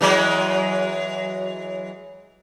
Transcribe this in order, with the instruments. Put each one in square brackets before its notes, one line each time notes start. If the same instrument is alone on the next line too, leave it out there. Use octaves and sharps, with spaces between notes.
[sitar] E3 F#3 G#3